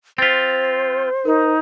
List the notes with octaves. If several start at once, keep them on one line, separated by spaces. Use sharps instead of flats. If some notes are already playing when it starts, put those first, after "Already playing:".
C4 F4 C5 A6 B6
D#4 A#4